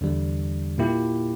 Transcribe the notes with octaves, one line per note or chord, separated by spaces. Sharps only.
E2 D3 G3
A#2 A#3 E4 G4